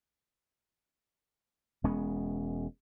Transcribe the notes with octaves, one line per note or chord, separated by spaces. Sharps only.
E1 G#3 B3 C#4